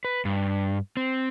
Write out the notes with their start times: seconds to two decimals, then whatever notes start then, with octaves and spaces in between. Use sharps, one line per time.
0.05 B4
0.25 G2
0.97 C4